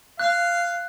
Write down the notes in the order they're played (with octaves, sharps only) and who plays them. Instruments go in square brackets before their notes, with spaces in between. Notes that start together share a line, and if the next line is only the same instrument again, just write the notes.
[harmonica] F5 [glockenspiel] F#6